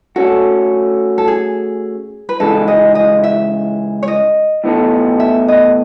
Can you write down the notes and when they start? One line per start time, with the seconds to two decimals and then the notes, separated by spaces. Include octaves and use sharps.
0.16 A3 C#4 F#4 A4
1.18 A4
1.28 G#4
2.29 B4
2.40 C#3 E3 G#3 D#4 A4
2.68 D#5
2.95 D#5
3.23 E5
4.03 C#5
4.08 D#5
4.64 A2 E3 B3 D#4 A4
5.20 E5
5.48 D#5